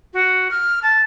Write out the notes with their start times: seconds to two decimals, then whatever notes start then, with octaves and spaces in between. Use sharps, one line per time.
0.13 F#4
0.51 F6
0.83 A5